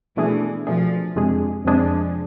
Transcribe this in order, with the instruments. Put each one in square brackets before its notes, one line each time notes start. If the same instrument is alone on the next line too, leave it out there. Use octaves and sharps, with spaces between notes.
[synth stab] B2 A3 D4 G#4 [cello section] E3
[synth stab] B2 A3 D4 G#4 [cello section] F3
[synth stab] F2 C3 G#3 D4 G#4
[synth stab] F2 C3 G#3 D4 G#4 [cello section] F3